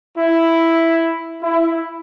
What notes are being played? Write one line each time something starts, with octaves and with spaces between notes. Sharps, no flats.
E4
E4